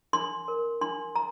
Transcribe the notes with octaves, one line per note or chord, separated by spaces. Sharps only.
D4 C6
A#4
D4 C6
A#5